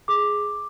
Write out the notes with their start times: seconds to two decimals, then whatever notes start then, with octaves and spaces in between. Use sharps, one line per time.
0.08 G#4 D6